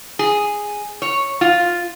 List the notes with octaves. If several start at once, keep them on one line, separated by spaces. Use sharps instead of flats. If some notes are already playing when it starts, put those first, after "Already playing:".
G#4
C#5
F4